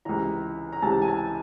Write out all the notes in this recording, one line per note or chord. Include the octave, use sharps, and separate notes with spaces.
C#2 C3 E3 A#5
A#5
C#2 C3 E3 A5
G#5
A5